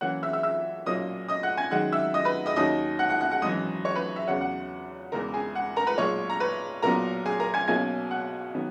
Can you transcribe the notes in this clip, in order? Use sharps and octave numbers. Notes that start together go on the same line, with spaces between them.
F#2 E3 A#3 C#4 F#5 F#6
E5 E6
E5 E6
E5 E6
B1 A#2 F#3 A#3 C#4 D#5 D#6
D#5 D#6
F#5 F#6
G#5 G#6
F#2 D#3 G#3 F#5 F#6
E5 E6
D#5 D#6
B4 B5
D#5 D#6
D#2 D#3 F#3 C#4 D#5 D#6
F#5 F#6
F#5 F#6
F#5 F#6
F#5 F#6
G#1 F#2 E3 D#5 D#6
C#5 C#6
B4 B5
E5
E2 C#3 F#3 C#4 F#5
F#5
E1 E2 C#3 E3 A#4 A#5
G#4 G#5
F#5
A#4 A#5
B4 B5
B1 A#2 G#3 C#5 C#6
A#5
B4 B5
B1 A#2 F#3 B3 A#4 A#5
G#4 G#5
A#4 A#5
G#5 G#6
B1 B2 F#3 A#3 C#4 G#5 G#6
F#5 F#6
D#3 F#3 B3